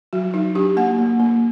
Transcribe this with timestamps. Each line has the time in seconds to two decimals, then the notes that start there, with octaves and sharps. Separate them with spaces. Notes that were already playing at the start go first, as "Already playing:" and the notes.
0.13 F#3 F#4
0.34 F#3 D#4
0.55 D4 G4
0.77 A#3 F#5
0.99 A#3
1.20 A#3